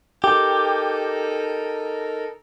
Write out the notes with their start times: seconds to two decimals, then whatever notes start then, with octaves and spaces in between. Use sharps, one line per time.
0.24 D#4 G4 A4 A#4